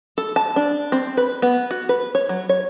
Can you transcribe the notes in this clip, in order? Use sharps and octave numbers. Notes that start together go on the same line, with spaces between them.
A4
A5
D4
C4
B4
B3
F#4
B4
C#5
F#3
C#5